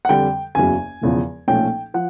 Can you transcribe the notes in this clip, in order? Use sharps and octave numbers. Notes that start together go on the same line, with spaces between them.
F#5
F2 D3 G3 G5
F#1 E2 C#3 F#3 G#5
E1 E2 C#3 F3
B1 A#2 F3 A3 C#4 G5
F3 F#5